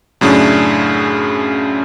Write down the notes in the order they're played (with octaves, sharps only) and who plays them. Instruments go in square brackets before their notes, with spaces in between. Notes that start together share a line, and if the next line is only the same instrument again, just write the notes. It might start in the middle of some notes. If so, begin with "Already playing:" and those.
[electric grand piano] F#2 A2 C#3 C#4 D4